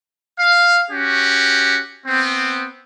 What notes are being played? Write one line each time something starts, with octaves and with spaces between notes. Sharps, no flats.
F5
C#4 F#4 G4
B3 C4